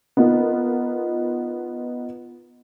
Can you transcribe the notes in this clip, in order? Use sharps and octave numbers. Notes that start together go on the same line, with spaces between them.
B3 D#4 F4 A#4